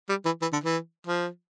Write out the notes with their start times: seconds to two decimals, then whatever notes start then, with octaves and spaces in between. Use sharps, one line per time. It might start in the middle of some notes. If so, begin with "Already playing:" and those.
0.09 G3
0.25 E3
0.42 E3
0.52 D3
0.64 E3
1.07 F3